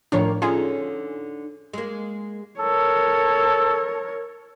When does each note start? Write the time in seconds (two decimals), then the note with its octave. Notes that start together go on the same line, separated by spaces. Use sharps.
0.12 A2 D#3 F3 A#3 D4 C#5
0.42 D3 C#4 D#4 F4 G#4
1.73 G#3 A#3
2.60 A4 A#4 C#5